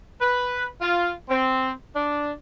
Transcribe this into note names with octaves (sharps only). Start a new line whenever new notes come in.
B4
F4
C4
D4